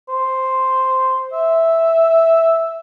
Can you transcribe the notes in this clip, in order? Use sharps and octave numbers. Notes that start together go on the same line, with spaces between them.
C5
E5